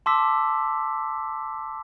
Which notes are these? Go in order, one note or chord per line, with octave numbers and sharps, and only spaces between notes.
A5 C6 D6 E6 B6